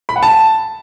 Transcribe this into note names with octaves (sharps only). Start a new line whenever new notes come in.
B5
F#5
A5